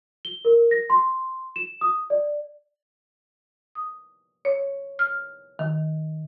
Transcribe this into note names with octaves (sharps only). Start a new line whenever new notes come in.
G7
A#4
A#6
C6
E7
D#6
D5
D#6
C#5
F6
D#3